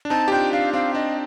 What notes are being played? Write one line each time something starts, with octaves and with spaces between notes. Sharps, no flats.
D4
C4 D#4 A5
G4
D4 F4 G5
D4 F5
C4 F5
D4 D#5